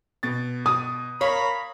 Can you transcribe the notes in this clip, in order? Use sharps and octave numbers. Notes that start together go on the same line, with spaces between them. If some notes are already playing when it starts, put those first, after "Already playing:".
B2 A6
D#6
A#4 C#5 F5 A#5 B5